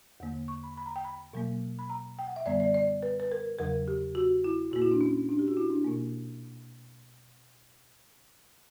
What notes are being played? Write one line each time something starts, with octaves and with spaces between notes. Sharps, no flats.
E2 D3 A#3
C#6
B5
B5
A#5
G5
B5
B2 F#3 A#3
B5
A#5
G5
F#5
E5
F#2 D3 G3 B3 D5
D5
D5
B4
B4
A#4
E2 C#3 F#3 A#4
G4
F#4
E4
A#2 A#3 F#4
E4
D4
C#4
D4
G4
F#4
E4
D4
B2 A#3